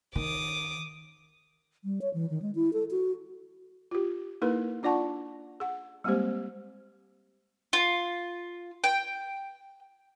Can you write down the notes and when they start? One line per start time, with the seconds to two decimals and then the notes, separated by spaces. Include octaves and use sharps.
0.15 D#3 D6 D#6
1.84 G3
2.01 C#5
2.14 E3
2.30 D#3
2.42 G#3
2.55 E4
2.73 A4
2.91 F#4
3.91 F4 G4
4.42 A#3 D#4 E4 G#4 A#4 B4
4.83 D4 F4 D5 F#5 A5 C#6
5.60 G#4 F#5
6.04 G3 G#3 A#3 C4 G4 C5
7.73 F4
8.84 G5